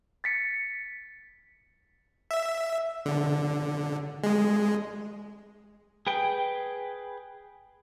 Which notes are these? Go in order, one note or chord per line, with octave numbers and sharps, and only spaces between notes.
A6 B6 C#7
E5
D3
G#3
G#4 B4 G5